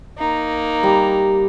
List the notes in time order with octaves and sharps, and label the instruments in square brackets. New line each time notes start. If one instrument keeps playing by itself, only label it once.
[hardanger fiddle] A#3 D#4
[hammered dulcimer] G3